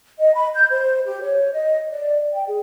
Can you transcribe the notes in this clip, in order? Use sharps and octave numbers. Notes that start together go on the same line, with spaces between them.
D#5
B5
G6
C5
G4
C#5
D#5
D5
G5
G#4